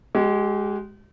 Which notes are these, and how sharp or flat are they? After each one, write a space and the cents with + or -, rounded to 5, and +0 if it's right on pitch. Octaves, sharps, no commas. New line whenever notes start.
G#3 +0 G4 -40